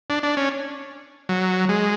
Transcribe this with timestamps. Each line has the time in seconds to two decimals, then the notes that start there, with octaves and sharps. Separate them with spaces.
0.10 D4
0.23 D4
0.37 C#4
1.29 F#3
1.69 G#3